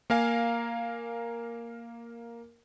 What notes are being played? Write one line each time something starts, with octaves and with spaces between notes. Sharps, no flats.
A#3 A#4 F5 G#5